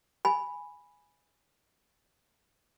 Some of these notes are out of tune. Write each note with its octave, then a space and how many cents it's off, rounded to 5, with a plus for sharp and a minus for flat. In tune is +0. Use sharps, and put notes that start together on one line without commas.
G#5 +0 B5 +0